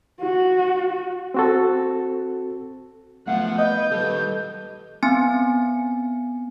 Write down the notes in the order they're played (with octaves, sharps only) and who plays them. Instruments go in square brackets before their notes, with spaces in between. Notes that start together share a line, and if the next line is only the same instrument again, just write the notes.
[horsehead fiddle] F#4
[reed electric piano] C4 F#4 A4
[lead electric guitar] F#2 F3 [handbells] A3 B3 F5 [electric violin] F#5
[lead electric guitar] B4 [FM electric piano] D#5 [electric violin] G6
[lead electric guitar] D#3 G3 [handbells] A4 B4
[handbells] B3 C4 G#5